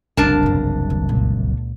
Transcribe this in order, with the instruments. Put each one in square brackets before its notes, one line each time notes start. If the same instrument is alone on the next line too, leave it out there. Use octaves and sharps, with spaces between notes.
[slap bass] F#1 C2 [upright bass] C3 F3 [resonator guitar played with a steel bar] D4 A#4 A5
[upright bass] E2 G2
D#2 E3
C#2 A#2